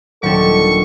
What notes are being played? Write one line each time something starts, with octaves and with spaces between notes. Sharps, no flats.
D#1 F#3 D4 A4 C#6